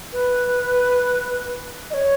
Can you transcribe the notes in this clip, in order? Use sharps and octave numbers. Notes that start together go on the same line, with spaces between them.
B4
D#5
C#5